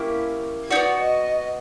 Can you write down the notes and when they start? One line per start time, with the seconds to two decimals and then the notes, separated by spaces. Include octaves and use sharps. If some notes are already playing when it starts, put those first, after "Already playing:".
Already playing: A#3 C#4 E4 G4
0.71 D#4 F#4 D5
0.75 B3
1.00 D#5